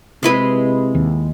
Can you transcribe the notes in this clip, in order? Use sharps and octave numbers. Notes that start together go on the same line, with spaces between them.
C3 G#3 E4 B4
D#2